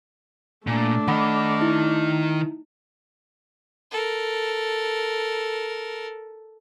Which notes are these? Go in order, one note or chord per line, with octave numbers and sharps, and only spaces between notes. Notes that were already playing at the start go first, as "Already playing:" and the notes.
A#2 A3 D4
D#3 D#5 F#5 B5 D6
D#4 E4
A4 A#4